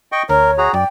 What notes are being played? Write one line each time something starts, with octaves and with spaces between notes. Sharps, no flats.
D#5 G5 C#6
D2 A#4 C#5
F#4 G#4 A#5
F#2 D5 G5